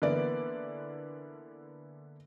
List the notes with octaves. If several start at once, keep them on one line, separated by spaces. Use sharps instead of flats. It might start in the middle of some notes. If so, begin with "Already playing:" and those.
D3 E3 A#3 B3 E4 D5